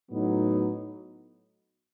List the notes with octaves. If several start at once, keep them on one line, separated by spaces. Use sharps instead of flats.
A2 F#3 B3 D#4